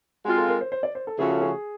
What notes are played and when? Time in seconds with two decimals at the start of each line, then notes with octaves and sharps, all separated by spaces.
0.25 G#3 C4 F4 F#4
0.37 A4
0.48 A#4
0.61 C5
0.72 C5
0.83 D5
0.95 C5
1.07 A4
1.19 C#3 F3 A3 C#4 F#4 G#4
1.29 A4
1.41 G#4